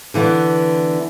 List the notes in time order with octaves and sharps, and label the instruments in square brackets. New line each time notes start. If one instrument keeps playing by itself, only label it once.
[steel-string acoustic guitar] D3 E3 B3